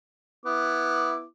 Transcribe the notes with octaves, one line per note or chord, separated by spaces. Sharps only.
B3 E4 D6